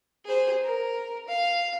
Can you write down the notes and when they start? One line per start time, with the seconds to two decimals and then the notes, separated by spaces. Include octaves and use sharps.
0.25 G#4 C5
0.63 A#4
1.28 F5